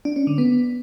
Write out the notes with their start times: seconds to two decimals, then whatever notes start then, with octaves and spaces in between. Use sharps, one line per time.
0.05 D4
0.16 C#4
0.27 D3
0.38 B3